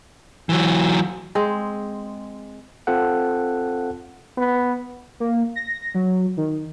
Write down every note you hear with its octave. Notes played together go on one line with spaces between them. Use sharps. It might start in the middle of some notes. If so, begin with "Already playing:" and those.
E3 F#3
G#3 C4
C4 F4 A4 F#5
B3
A#3
A#6
F#3
D#3